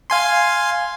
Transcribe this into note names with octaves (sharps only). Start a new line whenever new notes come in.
F5 G#5 C6